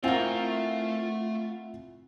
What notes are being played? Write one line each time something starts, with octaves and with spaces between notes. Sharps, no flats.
A3 C4 E4 F4 A#4 E5 F#5 G#5